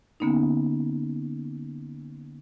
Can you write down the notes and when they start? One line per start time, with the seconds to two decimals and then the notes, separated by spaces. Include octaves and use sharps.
0.20 D3 A#3 B3 C#4 D#4